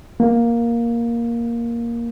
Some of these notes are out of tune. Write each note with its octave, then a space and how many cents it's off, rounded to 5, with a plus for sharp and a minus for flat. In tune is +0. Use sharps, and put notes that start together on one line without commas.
A#3 +5